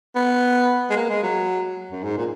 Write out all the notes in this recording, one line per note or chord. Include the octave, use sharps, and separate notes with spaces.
B3
G#3
A#3
G#3
F#3
F#2
G#2
A#2